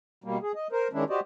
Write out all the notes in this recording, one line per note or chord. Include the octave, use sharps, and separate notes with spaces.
B2 G3 A#3
G#4
D#5
A#4 C5
D#3 G#3 C#4 D4 E4
F#4 G4 C5 D5 D#5